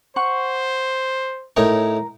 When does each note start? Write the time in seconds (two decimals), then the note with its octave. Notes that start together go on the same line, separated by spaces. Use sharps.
0.16 C5 F#5 C#6
1.57 A2 D#4 A#4 C#5